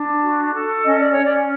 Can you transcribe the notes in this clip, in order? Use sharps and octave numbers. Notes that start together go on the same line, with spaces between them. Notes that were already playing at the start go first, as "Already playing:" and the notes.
Already playing: D4
F#4
A4
C#4 D#5
D5
C#5
C#4
D5